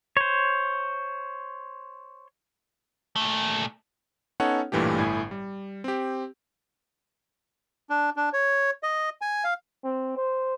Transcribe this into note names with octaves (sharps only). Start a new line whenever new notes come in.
C5 C#5
A#2 A3
B3 C#4 D#4 A4 C#5 F#5
A1 G2 A#2 E3 A3 G4
G1 A2 E4 G#5
G3
C4 G4
D4
D4
C#5
D#5
G#5
F5
C4
C5